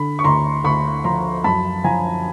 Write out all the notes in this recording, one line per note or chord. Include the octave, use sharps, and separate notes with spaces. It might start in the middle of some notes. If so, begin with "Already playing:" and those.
Already playing: D3 B5
C#6
D2 A#5 C6
D2 B5 C#6
F3 A#5 C6
F#2 A5 B5
F3 G#5 A#5